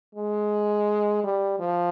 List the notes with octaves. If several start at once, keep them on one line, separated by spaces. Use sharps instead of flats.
G#3
G3
F3